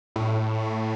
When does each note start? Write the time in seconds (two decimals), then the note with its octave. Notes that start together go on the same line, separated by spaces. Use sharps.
0.16 A2